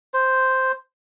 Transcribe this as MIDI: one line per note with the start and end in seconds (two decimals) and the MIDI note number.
0.14 0.72 72